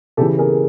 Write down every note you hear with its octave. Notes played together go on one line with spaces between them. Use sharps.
C#3 E3 G4 A4
G#4 A#4